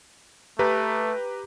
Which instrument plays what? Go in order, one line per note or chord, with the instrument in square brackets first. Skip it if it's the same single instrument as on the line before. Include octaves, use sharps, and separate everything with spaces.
[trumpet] A3 [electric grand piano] G4 B4 A#5